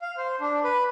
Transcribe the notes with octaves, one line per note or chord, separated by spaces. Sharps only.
F5
C5
D4
B4